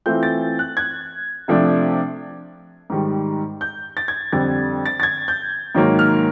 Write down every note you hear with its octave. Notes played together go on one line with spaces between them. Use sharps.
E3 A3 C4 F4 G6
A6
F#6
G#6
C3 F3 A3 D4
G#2 D#3 G3
G6
A6
G#6
F2 D3 G3 A6
A6
A6
G#6
G6
G#2 D#3 F#3 A#3
F6